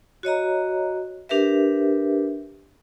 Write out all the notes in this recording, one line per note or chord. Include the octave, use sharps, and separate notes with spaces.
F#4 C#5 D#5 A#5
D4 G4 A#4 B4 E5